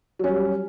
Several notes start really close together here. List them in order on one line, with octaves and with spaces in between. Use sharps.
F#3 C#4 G3